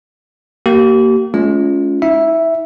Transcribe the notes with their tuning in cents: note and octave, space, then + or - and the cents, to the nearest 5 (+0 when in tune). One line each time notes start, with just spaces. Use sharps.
A#3 -10 G4 -40
G#3 +40 C#4 +20 F4 +0
E4 -45 E5 +0